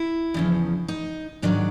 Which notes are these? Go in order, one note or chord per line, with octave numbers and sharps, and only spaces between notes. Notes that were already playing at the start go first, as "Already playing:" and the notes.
Already playing: E4
E2 C#3 F3
D#4
G#2 D#3 F#3 D4